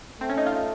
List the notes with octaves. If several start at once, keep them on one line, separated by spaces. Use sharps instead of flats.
A3 C4
C#4
D#4
F4